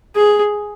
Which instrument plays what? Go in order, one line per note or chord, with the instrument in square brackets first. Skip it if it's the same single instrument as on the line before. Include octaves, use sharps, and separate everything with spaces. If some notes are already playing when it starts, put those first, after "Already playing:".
[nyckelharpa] G#4